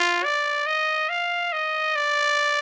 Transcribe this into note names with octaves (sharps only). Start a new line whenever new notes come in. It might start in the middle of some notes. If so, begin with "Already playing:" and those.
Already playing: F4
D5
D#5
F5
D#5
D5